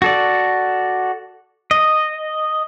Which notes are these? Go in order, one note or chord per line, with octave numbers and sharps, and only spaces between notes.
F#4 A4 D5
D#5